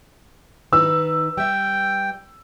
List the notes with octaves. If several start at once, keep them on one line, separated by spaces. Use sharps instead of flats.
D#3 D#4 B4 E6
G3 E5 G5